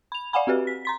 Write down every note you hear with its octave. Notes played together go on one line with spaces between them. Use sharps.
B5 F7
D5 F5 F#5 G#5 B5
C4 F#4 G4 B4
B6
A#5 C6 B6